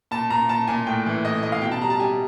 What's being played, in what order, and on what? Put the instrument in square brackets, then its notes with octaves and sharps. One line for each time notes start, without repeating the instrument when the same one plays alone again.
[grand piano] A#2 A5
A#2 A#5
A#2 A5
A#2 G#5
A2 G5
E3
A2 D#5
A2 D#5
F5
B2 G5
A5
G3 A#5
A5
G3 G#5